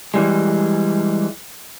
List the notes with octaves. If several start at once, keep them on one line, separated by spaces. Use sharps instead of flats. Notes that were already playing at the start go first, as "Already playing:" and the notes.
E3 G3 G#3